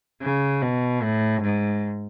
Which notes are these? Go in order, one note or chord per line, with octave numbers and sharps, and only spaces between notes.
C#3
B2
A2
G#2